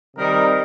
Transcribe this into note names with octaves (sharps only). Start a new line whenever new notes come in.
C3 D#3 G3 D#4 A#4